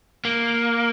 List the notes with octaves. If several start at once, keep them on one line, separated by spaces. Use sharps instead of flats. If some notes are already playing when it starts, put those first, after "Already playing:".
A#3